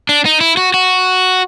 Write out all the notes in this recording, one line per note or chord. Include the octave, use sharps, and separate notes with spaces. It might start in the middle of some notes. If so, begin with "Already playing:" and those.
D4
D#4
E4
F#4
F#4